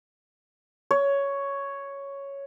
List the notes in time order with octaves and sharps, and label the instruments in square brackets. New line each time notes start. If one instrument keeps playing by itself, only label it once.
[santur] C#5